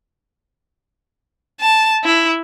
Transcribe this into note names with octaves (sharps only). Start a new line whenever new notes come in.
A5
E4